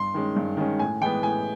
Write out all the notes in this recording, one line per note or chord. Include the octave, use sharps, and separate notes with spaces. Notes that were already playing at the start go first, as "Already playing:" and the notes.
Already playing: G2 C6
D#3 G#3 C#4
G2
D#3 G#3 C#4
A2 G#5
E3 G#3 B3 G5
A2 G#5